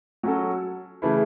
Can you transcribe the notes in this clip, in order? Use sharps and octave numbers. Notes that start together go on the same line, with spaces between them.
F#3 C#4 F#4 A4
C#3 E3 A3 E4